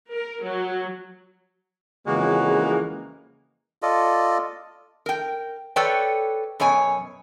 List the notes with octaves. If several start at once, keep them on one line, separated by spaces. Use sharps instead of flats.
A#4
F#3
F2 C#3 E3 G#3 A#3 F#4
F4 A4 D5 D#5
A#4 G5
A4 B4 C#5 D5 G5
F#2 B2 C#5 G#5